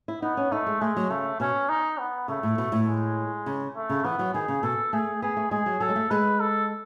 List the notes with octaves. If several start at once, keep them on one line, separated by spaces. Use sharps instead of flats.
E4
B3 D#4
C#4
A3 D#4
G#3
G#3 A3
F#3
C#3 A3
B2 C#4
D#4
B3
C#3 A3
A2
B2
A2
G#3
C#3
A3
C#3
E3 B3
F#3
D#3 G#4
C#3
B2 A4
A3 G#4
B3 G#4
A3
G#3 G#4
F#3
F#3 A4
G#3
A3
G#3 B4
A4